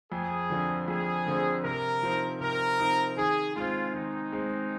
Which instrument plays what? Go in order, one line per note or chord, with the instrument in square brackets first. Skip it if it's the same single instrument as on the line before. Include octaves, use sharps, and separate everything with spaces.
[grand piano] F2 [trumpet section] G#4
[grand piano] D3 F3 C4
[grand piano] F2 [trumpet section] G#4
[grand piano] D3 F3 C4
[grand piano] C3 [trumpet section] A#4
[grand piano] F3 C4 D#4
[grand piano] C3 [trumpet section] A#4
[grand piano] F3 C4 D#4
[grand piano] D#3 [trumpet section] G#4
[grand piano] G#3 C4 [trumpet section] F4
[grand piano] D#3 [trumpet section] D#4
[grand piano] G#3 C4